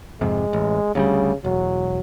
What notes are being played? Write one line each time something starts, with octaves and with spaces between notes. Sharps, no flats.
F2 G#2 C3 G#3
A1
D2 C#3 F#3 G3
E1 F#3